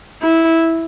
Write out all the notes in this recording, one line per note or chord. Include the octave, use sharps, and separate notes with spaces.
E4